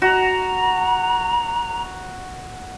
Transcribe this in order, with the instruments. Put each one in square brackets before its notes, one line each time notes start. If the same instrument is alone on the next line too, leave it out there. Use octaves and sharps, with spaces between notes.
[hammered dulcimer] F#4 [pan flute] A#5